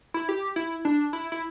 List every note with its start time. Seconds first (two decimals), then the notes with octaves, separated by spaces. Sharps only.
0.14 E4
0.29 G4
0.56 E4
0.85 D4
1.13 E4
1.32 E4